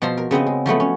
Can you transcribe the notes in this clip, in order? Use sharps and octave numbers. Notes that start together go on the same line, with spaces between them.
B2 F3 A5 A#5 C6
A#4
C#3 B3 C4 D#5
G#3
F3 F#3 A3 B3
C#4